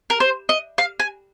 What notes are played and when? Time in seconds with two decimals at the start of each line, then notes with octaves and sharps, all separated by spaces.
0.10 A#4
0.20 C5
0.49 D#5
0.78 F5
1.00 G#5